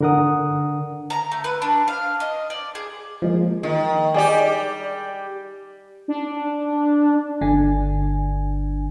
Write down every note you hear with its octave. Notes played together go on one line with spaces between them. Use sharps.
D3 D4 A#4 F#5 D#6
A#5
A3
B4
D4
F5
D#5
D5
G#4
F3 G#3 A#3
D#3
G3 G4 G#4 D5
D4
G1 D3 D4 G#5